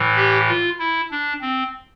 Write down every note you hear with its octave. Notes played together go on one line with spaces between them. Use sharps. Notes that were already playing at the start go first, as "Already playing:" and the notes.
Already playing: A2 E3
G4
F4
E4
D4
C4